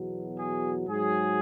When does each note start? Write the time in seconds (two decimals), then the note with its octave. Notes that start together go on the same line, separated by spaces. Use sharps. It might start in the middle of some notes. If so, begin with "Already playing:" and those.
Already playing: E2 B2 F#3
0.39 G#4
0.88 G#2 F#3 G#4